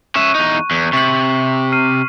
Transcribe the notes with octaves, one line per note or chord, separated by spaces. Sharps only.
C#4 E5 C#6 F#6 D#7
E2 D#4
E2
C3 C#6 B6 F#7
F6 C7 D#7